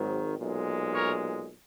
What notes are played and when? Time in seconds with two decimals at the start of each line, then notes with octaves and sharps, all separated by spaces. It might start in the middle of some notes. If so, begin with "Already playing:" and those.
Already playing: G#1 G#2 D#3 F#3
0.37 B1 A#2 G#3
0.94 A#4 C#5